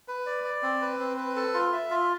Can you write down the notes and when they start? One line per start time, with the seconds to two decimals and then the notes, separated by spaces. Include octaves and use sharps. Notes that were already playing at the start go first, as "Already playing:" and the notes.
0.08 B4
0.26 D5
0.44 D5
0.63 C4
0.81 B4
0.99 C4
1.17 B4
1.36 A4
1.54 F4
1.73 E5
1.90 F4